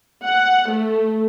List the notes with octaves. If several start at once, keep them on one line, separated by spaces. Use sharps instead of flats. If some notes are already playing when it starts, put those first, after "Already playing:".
F#5
A3